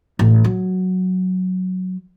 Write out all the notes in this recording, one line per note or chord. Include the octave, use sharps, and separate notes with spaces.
A1
F#3